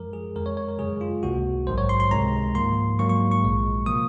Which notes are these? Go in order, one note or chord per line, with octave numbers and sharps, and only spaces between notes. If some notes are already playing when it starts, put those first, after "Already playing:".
Already playing: F#2 F3 G#3 A#4
G#4
F2 D#3 G#3 A#4
C#5
C#5
A#4
F#2 C#3 G#3 G#4
F4
C#2 C3 D#3 A#3 F#4
A#1 G#2 D#3 F#3 C5
C#5
C6
C6
C#2 C3 D#3 G#3 A#5
G#2 F3 A#3 C6
G#2 D#3 F#3 A#3 C#6
C#6
C#6
A#1 A#2 G#3
C3 F3 A#3 D#6